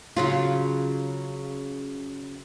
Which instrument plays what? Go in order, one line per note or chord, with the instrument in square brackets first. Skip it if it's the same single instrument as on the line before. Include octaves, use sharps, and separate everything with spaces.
[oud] C#3 F#3 F4